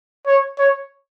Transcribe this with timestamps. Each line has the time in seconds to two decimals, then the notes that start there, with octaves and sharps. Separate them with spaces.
0.26 C#5
0.59 C#5